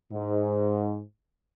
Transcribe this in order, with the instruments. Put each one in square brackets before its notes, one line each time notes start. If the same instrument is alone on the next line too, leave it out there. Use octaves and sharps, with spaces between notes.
[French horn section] G#2